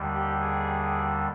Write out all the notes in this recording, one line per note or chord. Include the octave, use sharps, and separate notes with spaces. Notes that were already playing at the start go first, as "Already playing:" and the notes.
Already playing: D#2 D3 G3
G4
G#4